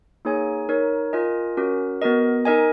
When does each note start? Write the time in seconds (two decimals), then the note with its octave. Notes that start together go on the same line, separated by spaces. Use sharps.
0.25 A#3 D#4 G#4 C#5 G#5
0.69 D#4 A#4 C#5
1.13 F4 A#4 D#5 G#5
1.57 C#4 F#4 A#4
2.02 B3 F#4 A#4 D#5
2.45 D#4 A#4 D#5 G#5